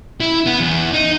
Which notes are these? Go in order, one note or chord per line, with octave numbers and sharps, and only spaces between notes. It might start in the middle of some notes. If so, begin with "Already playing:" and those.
E4
B3
E2
D#4